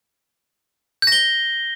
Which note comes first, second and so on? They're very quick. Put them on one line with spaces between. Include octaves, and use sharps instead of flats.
G6 A#6 G7